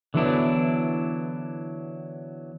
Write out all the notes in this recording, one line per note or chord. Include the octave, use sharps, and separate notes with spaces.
D3 E3 F#3 B3 D4 E4